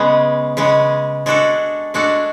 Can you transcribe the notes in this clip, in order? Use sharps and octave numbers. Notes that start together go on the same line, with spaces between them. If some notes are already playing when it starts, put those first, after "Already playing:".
Already playing: C#3 G#3 B3
C#3 G#3 B3
G#3 D4 F#4 A4
G#3 D4 F#4 A4